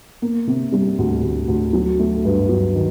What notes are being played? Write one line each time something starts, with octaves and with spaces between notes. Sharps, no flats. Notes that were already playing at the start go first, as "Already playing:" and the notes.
A#3
C3
G3
D2
D2
D2
F#3
A3
G2
F#3
D#3